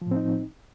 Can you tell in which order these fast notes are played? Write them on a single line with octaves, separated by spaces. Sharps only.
F3 A2 C4 D#4